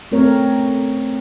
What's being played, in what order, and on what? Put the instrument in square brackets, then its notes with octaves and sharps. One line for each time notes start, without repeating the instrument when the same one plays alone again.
[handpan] A3 C4 A#4 C#5